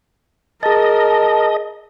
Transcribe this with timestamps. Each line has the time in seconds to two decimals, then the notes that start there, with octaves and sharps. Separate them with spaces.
0.63 G#4 A#4 D#5 A5 A6